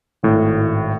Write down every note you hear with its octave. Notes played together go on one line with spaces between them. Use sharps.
G#1 A2